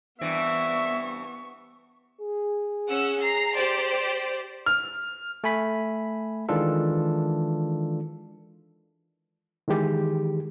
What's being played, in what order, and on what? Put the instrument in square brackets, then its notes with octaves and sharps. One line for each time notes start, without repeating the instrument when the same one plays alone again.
[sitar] G2 E3 C4 [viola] B3 C#6 [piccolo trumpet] E5
[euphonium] G#4
[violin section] C#4 F#5 E6
A#5 C7
G4 C5 D5
[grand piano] F6
[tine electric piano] A3 G#5 B5 B6
D#3 E3 G#3 D4 F4 A4
[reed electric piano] D#3 E3 G#3 G4